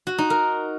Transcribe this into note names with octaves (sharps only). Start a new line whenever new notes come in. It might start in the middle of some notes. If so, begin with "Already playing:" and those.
F#4
D#4
A#4